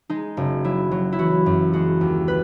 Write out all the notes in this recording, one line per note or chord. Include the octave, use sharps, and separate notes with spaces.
G#3 D#4
F#1
F#3 E4
F#3
E4
E3 F#4
F#2
G#3 F#4
D#2
B4